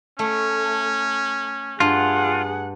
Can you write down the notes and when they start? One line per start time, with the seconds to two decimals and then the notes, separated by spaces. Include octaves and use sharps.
0.19 A3 C#4
1.80 G2 F4 G#4 F#5